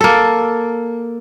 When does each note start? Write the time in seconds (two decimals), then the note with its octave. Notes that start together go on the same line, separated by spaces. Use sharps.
0.01 A#3 A4